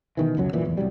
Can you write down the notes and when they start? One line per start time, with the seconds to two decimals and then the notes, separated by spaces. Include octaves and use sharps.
0.17 B2 D#3 E3
0.37 C#2 F#2 F#3
0.53 E1 A#2 E3
0.65 D1 E2
0.77 C2 F#3 G3